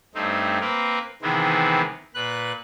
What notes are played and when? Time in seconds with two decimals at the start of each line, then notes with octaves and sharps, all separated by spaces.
0.15 G2 A3 C4 D#4
0.61 A#3 C4 A#4 B4
1.22 C3 D#3 E3 G#3 B3 C4
2.15 A#2 B4 F#6